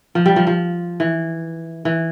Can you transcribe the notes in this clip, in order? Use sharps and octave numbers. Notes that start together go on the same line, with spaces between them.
F3
G3
F3
F3
E3
E3